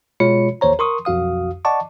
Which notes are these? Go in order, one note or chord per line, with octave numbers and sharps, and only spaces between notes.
B2 G#3 F4 C#5 B5 C#7
A1 D#2 C5 C#5 A#5
A#4 C6 C#6 D#6
B1 F2 F#4 F5 D#6
D5 D#5 F#5 A5 C#6 D6